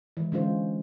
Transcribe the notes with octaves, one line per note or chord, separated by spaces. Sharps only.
E3 G#3
D3 G#3 C#4 F4 C5